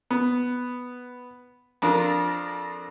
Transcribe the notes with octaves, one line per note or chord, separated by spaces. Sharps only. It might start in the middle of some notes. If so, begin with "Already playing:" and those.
B3
F2 D4 F4 A#4